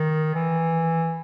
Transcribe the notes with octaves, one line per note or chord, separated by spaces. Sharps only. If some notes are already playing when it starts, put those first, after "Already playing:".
Already playing: D#3
E3